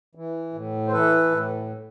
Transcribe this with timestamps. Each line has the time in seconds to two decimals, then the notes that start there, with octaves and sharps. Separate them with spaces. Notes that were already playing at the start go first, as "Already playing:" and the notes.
0.15 E3
0.53 A2
0.88 C5
0.92 E3 A4 B4
1.31 A2